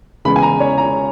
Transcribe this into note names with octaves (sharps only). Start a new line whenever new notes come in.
E2 C#3 G#3 B3 B5
G#5
A#5
C#5
A#5